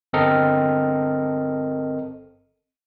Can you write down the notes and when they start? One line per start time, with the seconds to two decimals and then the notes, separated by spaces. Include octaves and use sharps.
0.13 G1 C4 A4 A#4 D#5 F6